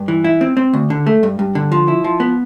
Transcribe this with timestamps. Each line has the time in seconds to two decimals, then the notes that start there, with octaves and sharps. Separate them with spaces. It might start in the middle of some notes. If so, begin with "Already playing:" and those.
Already playing: G2
0.08 E3
0.24 E4
0.41 C4
0.57 C4
0.73 D2
0.90 D3
1.07 A3
1.23 G2
1.39 G2
1.55 D3
1.72 F3
1.88 E4
2.04 F3
2.20 B3